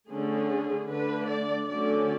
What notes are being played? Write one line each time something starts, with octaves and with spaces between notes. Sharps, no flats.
D3 A3 C#4 G#4
D3 A3 D4 B4
D5
D3 F#3 A3 C#4 D5